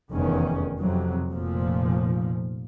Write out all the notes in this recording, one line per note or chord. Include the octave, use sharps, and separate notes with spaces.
F1 E2 D#3 C#4
F2 C3 F#3
F1 A#2 F3